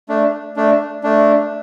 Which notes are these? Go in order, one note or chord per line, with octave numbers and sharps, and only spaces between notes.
A3 D4
A3 D4
A3 D4